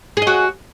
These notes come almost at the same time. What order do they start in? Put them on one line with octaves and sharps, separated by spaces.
G#4 D#5 F#4